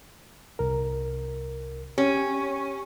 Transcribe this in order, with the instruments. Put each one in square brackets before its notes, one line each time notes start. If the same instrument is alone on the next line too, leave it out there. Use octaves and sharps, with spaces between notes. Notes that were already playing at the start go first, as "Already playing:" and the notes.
[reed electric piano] C2 A#4
[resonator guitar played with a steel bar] C#4 [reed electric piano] G4